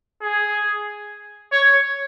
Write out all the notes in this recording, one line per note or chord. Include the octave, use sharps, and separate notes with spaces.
G#4
C#5